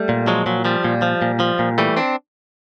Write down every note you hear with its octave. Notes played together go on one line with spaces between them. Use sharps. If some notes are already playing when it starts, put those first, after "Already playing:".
Already playing: G3 A3
A#2
F3 F#3 G#3
A#2 F#3
F3 G3
A#2
F3
A#2
F3
A#2
E3 G3 A3
C4 D4